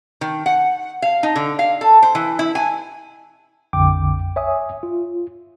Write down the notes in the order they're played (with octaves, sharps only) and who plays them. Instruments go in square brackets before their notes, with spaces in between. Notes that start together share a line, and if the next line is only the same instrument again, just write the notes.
[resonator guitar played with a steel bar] D#3
F#5
F5
D#4
D3
F5
A4
C5
E3
E4
G#5
[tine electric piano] A#1 F2 D3 G5 D6
C#5 E5 G#5 D#6
F4